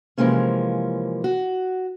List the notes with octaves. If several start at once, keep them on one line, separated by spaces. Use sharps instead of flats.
C3 E3 F3 G#3 A#3 C#4
F#4